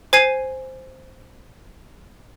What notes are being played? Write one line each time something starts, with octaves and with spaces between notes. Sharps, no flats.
C5 G#5 G#6 C7 D#7